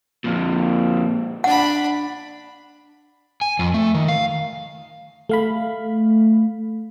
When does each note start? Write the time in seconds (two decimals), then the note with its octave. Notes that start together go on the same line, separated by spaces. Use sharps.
0.24 F2 A#2
1.44 D4 F#5 B5
3.41 G#5
3.59 F2
3.74 A3
3.94 D#3
4.08 F5
5.29 A3 F5 B5